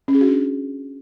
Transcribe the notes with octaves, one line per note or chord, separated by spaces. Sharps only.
C#4
G#4
F#4
D4